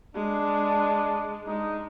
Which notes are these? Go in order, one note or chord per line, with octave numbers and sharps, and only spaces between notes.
G#3 D4
G#3 D#4